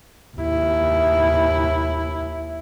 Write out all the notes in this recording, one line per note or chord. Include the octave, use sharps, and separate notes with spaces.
D#2 E4